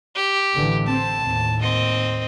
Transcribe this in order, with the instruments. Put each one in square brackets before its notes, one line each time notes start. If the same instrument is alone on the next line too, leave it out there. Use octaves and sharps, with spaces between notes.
[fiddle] G4
[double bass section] A1 D3 E3
[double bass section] C4 [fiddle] A5
[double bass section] D#2 A2
[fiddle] C4 D#5